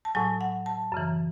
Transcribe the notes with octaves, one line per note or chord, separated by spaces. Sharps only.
A5
A2 F#3 G#5
F#5
A5
F#2 C#3 E3